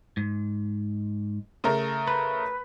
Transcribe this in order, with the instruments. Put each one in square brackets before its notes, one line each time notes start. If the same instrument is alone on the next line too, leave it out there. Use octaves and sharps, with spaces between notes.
[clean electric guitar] G#2
[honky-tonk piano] C#3 A3 A#4
[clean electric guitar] B4